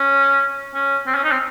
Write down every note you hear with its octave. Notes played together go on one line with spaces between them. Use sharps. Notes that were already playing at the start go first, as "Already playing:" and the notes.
Already playing: C#4
C#4
C4
C#4
D#4
C4